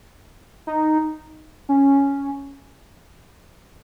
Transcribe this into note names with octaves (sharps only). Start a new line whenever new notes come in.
D#4
C#4